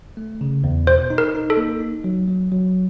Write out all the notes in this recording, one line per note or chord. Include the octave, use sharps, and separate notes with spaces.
A3
C#3
E2
B2 C5
D#4
A#4
D#4
A4
A#3
D#4
F#3
F#3
F#3